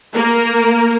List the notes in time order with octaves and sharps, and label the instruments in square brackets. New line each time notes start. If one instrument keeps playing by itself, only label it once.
[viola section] A#3 A#4